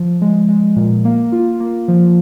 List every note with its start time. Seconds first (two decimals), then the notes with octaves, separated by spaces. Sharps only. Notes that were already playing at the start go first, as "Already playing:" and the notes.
Already playing: F3
0.21 G#3
0.49 G#3
0.76 A#2
1.05 A#3
1.32 F4
1.60 A#3
1.88 F3